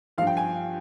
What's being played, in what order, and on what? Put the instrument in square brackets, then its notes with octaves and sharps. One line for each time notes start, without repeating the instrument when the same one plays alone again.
[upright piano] F3 F5
G2
G5
G#5